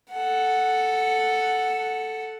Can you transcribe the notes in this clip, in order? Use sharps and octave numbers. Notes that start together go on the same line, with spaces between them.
A4 F#5